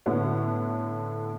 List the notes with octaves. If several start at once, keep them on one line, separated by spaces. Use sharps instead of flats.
A2 D3 B3 C#4